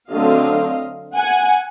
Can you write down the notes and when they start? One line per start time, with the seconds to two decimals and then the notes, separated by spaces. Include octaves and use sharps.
0.12 D3 F#3 A3 C4 D#5 F5
1.16 F#5 G#5